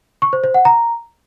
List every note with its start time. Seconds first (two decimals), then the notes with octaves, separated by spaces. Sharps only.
0.22 C#6
0.33 C5
0.44 C5
0.54 F#5
0.65 A#5